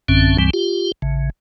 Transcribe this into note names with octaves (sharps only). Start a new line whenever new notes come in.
A1 F#2 D3 C4 C#4
C#2 G2 E3 G3 C4
F4 G4
A1 C#3